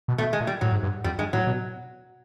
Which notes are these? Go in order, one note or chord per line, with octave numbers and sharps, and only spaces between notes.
B2
B2 A3
G#3
A#2
G3
A2 F#3
G#2
G2
F2 G3
G2 G#3
A2 F#3
B2